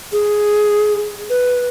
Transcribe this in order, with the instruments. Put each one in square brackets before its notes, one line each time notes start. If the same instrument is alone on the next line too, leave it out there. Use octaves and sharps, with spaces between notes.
[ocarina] G#4
B4